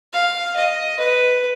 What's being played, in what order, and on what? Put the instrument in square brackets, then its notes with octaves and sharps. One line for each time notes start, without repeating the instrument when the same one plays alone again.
[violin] F5
D#5
B4